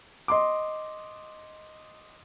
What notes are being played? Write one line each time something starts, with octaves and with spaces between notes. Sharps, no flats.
D#5 C6 D6